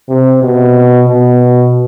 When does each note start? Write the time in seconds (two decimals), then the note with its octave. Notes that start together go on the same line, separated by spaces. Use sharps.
0.09 C3
0.43 B2
1.08 B2